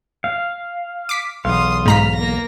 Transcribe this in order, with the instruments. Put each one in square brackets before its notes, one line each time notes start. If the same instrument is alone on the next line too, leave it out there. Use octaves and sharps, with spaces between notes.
[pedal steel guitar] F5
[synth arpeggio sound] D6 B6
[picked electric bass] B1 E2 [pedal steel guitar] F5 [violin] C6 D#6
[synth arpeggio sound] G#2 A#5 B6 [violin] F6
[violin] A#3 A#6